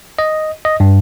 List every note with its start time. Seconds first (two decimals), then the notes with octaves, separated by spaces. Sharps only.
0.19 D#5
0.65 D#5
0.80 G2